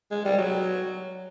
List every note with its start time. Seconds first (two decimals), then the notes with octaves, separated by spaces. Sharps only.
0.11 G#3
0.25 G3
0.38 F#3